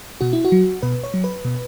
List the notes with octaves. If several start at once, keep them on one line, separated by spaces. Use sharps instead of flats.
B2 F#4
E4
F#4
F#3
B2 B4
C#5
F#3
B4
B2